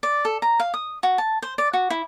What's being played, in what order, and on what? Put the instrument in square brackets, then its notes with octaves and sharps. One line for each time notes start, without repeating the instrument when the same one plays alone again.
[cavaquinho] D5
A4
A#5
F5
D#6
F#4
A5
C5
D5
F#4
E4